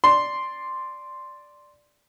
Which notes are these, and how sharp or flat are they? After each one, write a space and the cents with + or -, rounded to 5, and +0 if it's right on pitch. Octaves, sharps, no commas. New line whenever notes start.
D5 +0 C6 +0